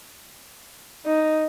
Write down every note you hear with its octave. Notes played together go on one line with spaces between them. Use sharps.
D#4